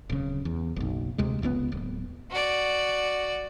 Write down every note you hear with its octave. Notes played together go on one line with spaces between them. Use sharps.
D1 C#3
E2
F#1 B1
D2 C3 G#3
F1 C#2 D3 B3
D1
F#4 D5